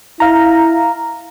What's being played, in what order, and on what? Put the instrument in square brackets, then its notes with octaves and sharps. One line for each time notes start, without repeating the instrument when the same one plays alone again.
[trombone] E4 [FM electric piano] F5 A#5